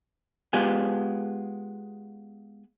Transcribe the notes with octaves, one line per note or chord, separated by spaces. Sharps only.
G#3 B3 F4 G4 G#4